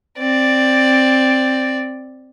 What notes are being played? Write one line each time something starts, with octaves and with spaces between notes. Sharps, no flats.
C4 D5